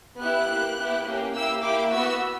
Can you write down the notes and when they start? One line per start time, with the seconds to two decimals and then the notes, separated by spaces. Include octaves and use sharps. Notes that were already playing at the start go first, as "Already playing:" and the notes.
0.20 B3 E4 G4 F#6
0.49 A#3 E4 G4
0.78 B3 E4 G4
1.06 A#3 C#4 G4
1.35 A#3 E4 G4 E6
1.63 A#3 E4 G4 D6
1.91 B3 F#4 E6